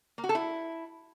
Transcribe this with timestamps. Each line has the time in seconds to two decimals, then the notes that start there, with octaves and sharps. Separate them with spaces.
0.18 A#3
0.24 F#4
0.29 A4
0.35 E4